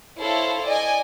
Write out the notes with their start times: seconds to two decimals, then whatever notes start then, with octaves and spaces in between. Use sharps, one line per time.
0.20 E4 A4 C5 C#5 F5
0.65 D5 D#5 G#5